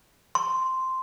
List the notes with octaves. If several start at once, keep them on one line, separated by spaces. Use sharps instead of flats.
C6